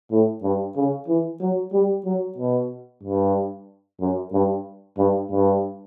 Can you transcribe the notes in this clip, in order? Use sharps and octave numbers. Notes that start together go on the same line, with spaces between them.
A2
G2
C#3
E3
F#3
G3
F#3
B2
G2
F#2
G2
G2
G2